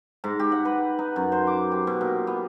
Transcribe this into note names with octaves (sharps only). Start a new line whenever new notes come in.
G#2
G4
F#5
B4
D#4
F#2
C5
D6
G4
B2
A#2
B3